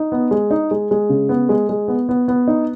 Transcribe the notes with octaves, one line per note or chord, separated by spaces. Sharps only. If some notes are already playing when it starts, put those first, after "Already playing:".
Already playing: D#4
B3
G#3
D#4
G#3
G#3
C#3
B3
G#3
G#3
B3
B3
B3
D#4